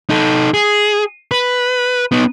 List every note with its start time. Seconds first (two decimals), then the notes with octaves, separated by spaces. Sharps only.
0.10 D#4 A4
0.54 G#4
1.31 B4
2.12 B3 D#4